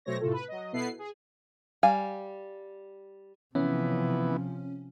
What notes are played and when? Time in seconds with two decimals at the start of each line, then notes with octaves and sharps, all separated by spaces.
0.05 B2 F#3 A3 C4 C#5 A#6
0.20 A2 C3 A3 F4 A4
0.33 B4
0.48 F#3 D#5
0.73 B2 B3 E4 A4 B4 C7
0.99 G#4
1.83 G3 F5 G#5
3.55 C3 E3 F3 B3 C#4